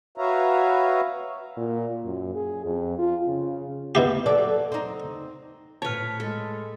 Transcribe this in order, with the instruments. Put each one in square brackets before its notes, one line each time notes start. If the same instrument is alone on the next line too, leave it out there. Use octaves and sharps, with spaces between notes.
[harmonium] F#4 B4 C#5 E5 F5 A#5
[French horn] A#2
F#2
G#4
F2
F4
C#3
[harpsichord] B2 E4 G4
[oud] F#3 A4 D5
C4 D#4
[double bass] A2 [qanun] B4 C#5 [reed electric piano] A5 F6
[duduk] G#3 [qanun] A4